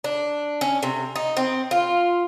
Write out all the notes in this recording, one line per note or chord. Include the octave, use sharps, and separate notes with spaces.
D4
C#4
C3
D#4
C4
F4